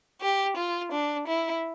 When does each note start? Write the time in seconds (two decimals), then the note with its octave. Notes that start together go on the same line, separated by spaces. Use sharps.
0.21 G4
0.57 F4
0.92 D4
1.27 E4